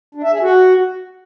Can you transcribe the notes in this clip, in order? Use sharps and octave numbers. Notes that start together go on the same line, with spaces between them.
D4
E5
G#4
F#4